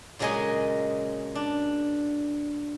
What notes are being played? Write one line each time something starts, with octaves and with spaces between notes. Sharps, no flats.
A#2 C#3 F#3 G#3 D#5 G#5
D4